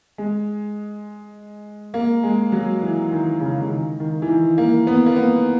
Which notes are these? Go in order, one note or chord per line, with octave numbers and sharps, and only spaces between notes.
G#3
A#3
G#3
F#3
E3
D#3
C#3
C#3
D#3
D#3
E3
D#3
A#3
B3
A#3
B3